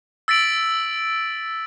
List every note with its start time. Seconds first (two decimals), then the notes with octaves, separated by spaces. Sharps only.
0.28 E6 A6 B6 D7 F#7